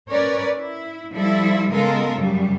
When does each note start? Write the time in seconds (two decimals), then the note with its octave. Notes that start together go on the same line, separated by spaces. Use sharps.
0.10 C#4 A#4 B4 C#5 D5
0.55 E4
1.11 F3 G3 E4 A4
1.71 C#3 G#3 B3 F4 A4 A#4
2.15 F#2 C#3 G3 A3